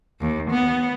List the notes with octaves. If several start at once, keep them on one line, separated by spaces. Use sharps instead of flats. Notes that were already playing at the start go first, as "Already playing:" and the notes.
D#2
B3